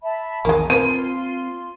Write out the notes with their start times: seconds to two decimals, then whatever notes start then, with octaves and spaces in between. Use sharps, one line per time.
0.03 E5 A5 B5
0.45 A#1 E2 D#3 G#3 A#3 G#5 A#5
0.70 F3 A#3 C4 F4 B4 C6 D#7